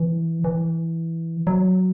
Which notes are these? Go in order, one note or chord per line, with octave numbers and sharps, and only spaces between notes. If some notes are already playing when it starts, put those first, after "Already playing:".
Already playing: E3
E3
F#3